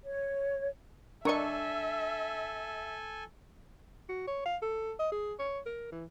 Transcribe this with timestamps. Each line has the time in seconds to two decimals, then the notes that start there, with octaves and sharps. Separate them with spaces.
0.04 C#5
1.25 D4 A4 A#4 D#5 E5 G#5 C#6
4.09 F#4
4.27 C#5
4.45 F5
4.62 A4
4.99 D#5
5.12 G#4
5.39 C#5
5.66 A#4
5.92 E3